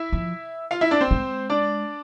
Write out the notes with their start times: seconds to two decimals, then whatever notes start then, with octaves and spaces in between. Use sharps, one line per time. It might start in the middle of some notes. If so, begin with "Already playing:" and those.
Already playing: E4 E5
0.12 F3
0.71 F4 F5
0.81 E4 E5
0.91 D4 D5
1.01 C4 C5
1.11 G#3
1.50 D4 D5